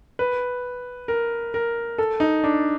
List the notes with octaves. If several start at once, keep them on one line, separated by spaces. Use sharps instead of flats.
B4
A#4
A#4
A4
D#4
D4